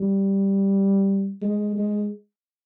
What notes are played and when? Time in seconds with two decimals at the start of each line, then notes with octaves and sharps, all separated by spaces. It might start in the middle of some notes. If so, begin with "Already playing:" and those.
Already playing: G3
1.42 G#3
1.76 G#3